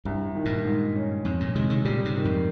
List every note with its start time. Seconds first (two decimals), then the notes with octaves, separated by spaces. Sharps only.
0.05 C2 G2
0.35 D#3
0.45 G2 A#2
0.65 G#2
0.96 C#4
1.25 F2 G#2 C#4
1.40 G2 A#2
1.55 C3 D#3 G#3
1.70 C3 D#3
1.85 A#2 C#3 G3
2.05 G#2 C3
2.16 D#3
2.25 F2 G#2